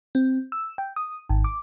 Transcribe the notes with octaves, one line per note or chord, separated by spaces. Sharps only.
C4
E6
G5
D#6
G#1
D6